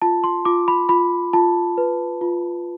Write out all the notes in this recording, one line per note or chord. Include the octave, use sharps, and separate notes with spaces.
F4 A5
C6
F4 D6
B5
F4 B5
F4 A5
B4
F4